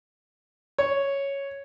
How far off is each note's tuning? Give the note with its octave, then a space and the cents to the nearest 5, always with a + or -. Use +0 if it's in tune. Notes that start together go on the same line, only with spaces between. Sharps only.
C#5 +0